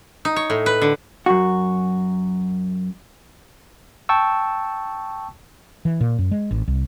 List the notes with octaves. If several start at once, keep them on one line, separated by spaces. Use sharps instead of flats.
D#4
C#5
A2
B4
D3
F#2 F#4
G5 A5 C#6 E6
E3
A#2
F#2
G#3
A1
C2